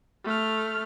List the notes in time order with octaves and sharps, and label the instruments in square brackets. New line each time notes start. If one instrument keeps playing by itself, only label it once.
[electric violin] A3 F6